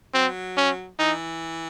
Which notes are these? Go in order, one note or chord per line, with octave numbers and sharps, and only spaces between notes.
F#3 C4
C#4
E3 D#4